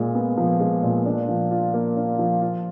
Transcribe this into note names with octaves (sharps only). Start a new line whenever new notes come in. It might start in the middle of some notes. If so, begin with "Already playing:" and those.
Already playing: A#2 G#3
B3
F3
G#3
A#2
D4
F3
F4
A#3
D4
F3
F4